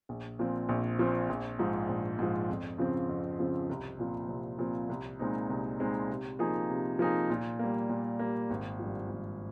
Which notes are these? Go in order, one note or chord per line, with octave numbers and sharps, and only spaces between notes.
A#1
A#2 F3 C4
A#1
A#2 F3 C4
A#1
G#2 F3
A#1
G#2 F3
F2
C#3 F3 C4
F2
C#3 F3 C4
C2
A#2 F3 C4
C2
A#2 F3 C4
C2
A#2 G#3 C4 D#4
C2
A#2 G#3 C4 D#4
C3
F3 A#3 D#4 G#4
C3
F3 A#3 D#4 G#4
A#2
G3 A#3
A#2
G3 A#3
G#1
G2 F3
G#1